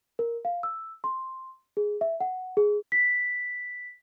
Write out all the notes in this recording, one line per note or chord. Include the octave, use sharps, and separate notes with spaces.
A#4
F5
E6
C6
G#4
E5
F#5
G#4
B6